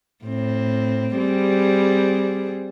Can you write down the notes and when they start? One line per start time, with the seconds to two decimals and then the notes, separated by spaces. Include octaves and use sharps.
0.24 A2 C4
1.17 G3 C4 G#4